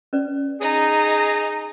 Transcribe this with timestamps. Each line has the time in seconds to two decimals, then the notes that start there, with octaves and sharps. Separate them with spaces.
0.13 C#4 B4 D5
0.61 D#4 G#4